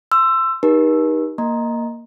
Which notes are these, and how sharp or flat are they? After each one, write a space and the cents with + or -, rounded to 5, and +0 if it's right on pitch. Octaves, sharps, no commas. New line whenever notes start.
C6 +0 E6 +20
D#4 +0 G4 +0 A#4 +45
A#3 +0 D#5 +0 A#5 +5